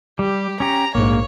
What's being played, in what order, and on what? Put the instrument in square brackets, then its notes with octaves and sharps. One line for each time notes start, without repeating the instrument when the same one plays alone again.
[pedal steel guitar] G3 [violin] G4
[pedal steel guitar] C#4 G4 [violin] A#5
[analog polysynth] A#1 G#2 [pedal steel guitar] A#3 [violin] C#5